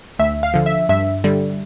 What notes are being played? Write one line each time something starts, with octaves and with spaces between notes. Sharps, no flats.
D2 E5
F5
D3 F3
E5
G2 E5
D3 G3